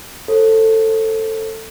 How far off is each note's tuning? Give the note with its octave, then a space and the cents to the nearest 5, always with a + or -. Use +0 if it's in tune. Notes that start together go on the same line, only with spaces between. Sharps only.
A4 +15 C5 +35